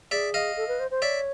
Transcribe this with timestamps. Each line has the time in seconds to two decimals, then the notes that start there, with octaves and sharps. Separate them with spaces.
0.11 G#4 D5 E5
0.34 D#5 F5
0.57 A4
0.68 B4
0.80 C5
0.91 C5
1.02 C#5 D5 E5